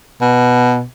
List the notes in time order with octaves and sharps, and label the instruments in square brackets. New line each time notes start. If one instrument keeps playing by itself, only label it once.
[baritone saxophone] B2